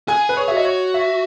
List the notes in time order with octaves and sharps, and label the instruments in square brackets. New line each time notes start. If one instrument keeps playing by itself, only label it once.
[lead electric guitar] G#4 [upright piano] G#5
[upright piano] B4
C#5
[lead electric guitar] F#4 [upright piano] E5
[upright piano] D#5
C#5
E5